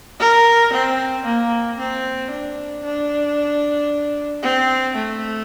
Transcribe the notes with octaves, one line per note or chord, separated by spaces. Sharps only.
A#4
C4
A#3
C4
D4
D4
C4
A3